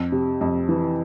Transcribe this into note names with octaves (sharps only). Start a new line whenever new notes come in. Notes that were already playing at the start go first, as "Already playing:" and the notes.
Already playing: F2
C3
F2
E3